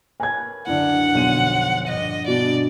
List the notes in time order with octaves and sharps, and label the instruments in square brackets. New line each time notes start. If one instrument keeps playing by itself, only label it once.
[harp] A#4 B4 C#5 [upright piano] G#5 G#6
[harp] C#2 F#2 D3 [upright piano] D4 E4 [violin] F#5
[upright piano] B1 D#7 [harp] F2 G#3 C6
[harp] G2 A#2 G3 [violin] D#5
[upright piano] B2 [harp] C#4 D4 B4 [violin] D5